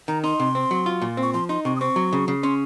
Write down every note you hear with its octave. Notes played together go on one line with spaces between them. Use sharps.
D#3 A#5
D#4 C6
C3
C4
F#3
F4
A#2
C4
C#6
F3 C6
D#4 C6
C3 C#6
D#6
C4 C#6
F#3
C#3
C#3
C#4 C6